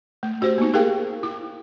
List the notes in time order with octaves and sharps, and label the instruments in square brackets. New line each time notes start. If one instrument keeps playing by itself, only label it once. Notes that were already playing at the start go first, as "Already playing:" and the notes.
[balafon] A3
C#4 F#4 G4 C5
A#3 B3 D#4
G4 G#4 A#4 F5 G5
E4